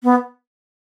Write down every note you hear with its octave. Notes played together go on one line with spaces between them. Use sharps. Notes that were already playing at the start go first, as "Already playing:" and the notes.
B3